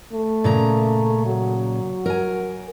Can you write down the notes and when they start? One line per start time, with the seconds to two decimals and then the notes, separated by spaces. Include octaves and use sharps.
0.13 A3
0.44 A#2 C#3 A#5
1.26 F#3
2.06 A#4 G#5